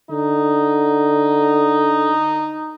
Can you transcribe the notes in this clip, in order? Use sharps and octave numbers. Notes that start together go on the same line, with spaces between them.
D3 D#4